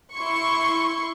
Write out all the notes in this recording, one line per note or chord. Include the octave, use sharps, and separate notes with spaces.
E4 C6 C#6